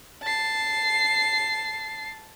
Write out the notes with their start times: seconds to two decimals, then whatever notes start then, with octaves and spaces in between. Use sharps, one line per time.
0.23 A5 C7